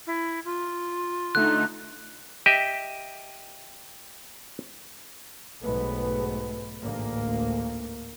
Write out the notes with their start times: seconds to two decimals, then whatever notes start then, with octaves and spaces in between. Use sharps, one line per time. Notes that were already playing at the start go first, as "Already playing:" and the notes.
0.07 E4
0.45 F4
1.35 D3 A3 D#4 F#6
2.46 G4 D#5 E5
5.63 B1 G#2 G#3 A3 B3
6.80 A1 D2 G#2 A#3